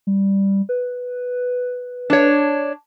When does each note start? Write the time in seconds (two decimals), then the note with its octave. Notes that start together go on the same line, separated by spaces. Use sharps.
0.07 G3
0.69 B4
2.10 D4 C#5